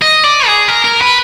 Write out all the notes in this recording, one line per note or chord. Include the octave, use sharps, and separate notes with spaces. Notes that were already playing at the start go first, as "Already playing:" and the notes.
D#5
D5
G#4
A#4
A#4
B4